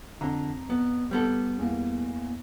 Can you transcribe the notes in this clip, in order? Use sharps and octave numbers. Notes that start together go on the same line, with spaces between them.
F2 D3 A#5
B3
G3 B3 A4
E2 A#3